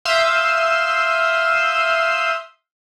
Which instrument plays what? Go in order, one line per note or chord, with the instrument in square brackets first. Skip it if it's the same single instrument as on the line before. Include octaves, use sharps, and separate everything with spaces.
[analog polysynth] E5 F5 C6 D#6 E6 G6